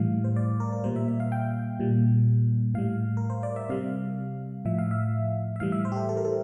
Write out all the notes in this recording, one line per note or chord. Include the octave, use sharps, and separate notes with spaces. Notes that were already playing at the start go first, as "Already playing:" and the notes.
Already playing: A2 E3 G3 F5
C5
D5
A#4
A#4
A#2 G3 C5
E5
E5
F5
G5
A#2 G3
A2 G3 F5
A#4
C5
D5
E5
C3 G3 F5
A2 F3 E5
F5
E5
E5
A2 E3 G3 F5
E5
C5
G4
A4
A4
A#4
A4